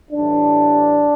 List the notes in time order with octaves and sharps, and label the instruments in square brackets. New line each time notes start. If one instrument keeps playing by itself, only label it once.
[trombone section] A2 E3 G3 D4